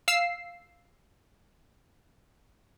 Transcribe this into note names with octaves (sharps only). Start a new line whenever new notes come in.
F5 E6 C7